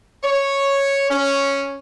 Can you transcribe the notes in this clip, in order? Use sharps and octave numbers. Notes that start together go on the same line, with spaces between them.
C#5
C#4